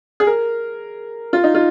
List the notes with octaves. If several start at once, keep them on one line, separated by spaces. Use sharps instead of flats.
G#4
A#4
F4
D#4
F4